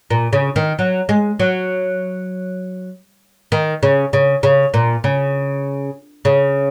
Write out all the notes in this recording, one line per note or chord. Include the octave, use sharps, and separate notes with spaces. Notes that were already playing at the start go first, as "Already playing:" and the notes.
A#2
C#3
D#3
F#3
G#3
F#3
D#3
C#3
C#3
C#3
A#2
C#3
C#3